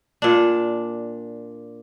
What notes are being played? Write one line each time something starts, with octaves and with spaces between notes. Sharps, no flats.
A#2 D4